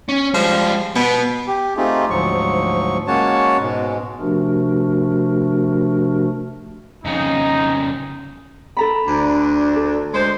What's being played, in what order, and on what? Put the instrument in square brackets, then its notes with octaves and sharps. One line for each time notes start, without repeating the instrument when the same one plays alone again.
[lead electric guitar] C#4
[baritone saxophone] F3 [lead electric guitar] G3 G#3
[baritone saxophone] B2 [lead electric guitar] B3
[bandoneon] G4
A3 C4 D#4 F4 G4 G#4
D2 G#2 F3 F#3 C#6
G#3 A#3 C#4 F#4 C#5 A5
G#2 B2 G#3
[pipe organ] C3 F3 A3 D4 F#4 A#4
[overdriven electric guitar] F2 C#3 [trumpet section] D#4
[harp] A4 A#5 B5
[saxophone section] D2 D4
[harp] A4
[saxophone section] D2 G#3 C5